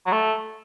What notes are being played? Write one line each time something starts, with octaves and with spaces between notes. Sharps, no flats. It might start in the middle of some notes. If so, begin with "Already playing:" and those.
F#3
A3